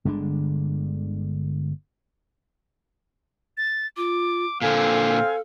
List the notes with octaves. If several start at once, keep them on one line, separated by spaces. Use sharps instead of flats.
G1 D3 G#3 D4
A6
F4 D6
A#2 D3 C4 A4 F5 G#5